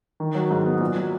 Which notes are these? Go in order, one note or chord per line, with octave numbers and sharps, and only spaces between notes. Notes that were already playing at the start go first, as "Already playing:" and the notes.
D#3
F#3
G#2
B3
A#2
F#3